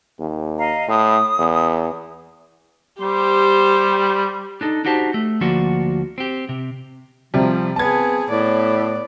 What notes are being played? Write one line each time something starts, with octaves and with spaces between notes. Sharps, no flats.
D#2
D#5 F5 A#5
A2 D#6
E2
G3 G4 C5
D4 D#4 A4
D4 D#4 F#4 G4 C5 A5
A3
D2 F3 A#3 D4 F#4
C4 G4
C3
C3 F3 G3
B3 C4 G#4 A5 G#6
A2 B3 D5